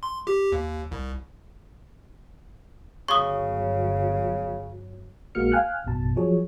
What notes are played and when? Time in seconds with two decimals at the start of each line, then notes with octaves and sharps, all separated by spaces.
0.03 C6
0.27 G4
0.52 D#2
0.92 C2
3.08 G1 C#3 F#3 C#6 D#6
5.35 A#1 G#3 A#3 F#4 F6 C#7
5.52 F5 G5 G#5 F6 F#6
5.85 A1 F#2 B2 A5
6.16 F3 F#3 G#4 C#5